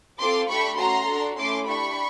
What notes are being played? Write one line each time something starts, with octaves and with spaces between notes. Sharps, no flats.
C4 F4 A4 C6 D6
A3 D4 G4 B5 C#6
A3 C#4 F#4 A#5 C6
D4 F#4 A4
A3 C#4 E4 A4 C6 D6
D4 G4 B5 C#6